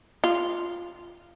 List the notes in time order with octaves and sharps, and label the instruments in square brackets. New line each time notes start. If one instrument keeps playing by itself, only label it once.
[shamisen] F4